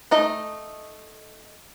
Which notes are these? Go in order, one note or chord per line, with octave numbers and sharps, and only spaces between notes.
A3 D#4 D#5